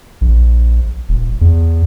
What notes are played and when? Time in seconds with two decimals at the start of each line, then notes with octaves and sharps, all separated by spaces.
0.21 A#1
1.09 D#1
1.41 E2